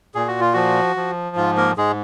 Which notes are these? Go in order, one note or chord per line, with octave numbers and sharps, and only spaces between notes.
A#2 G#4
F#4
F4
F3 F#4
F3
G#2 F4
A#3 A#4
G#2 G#3 G#4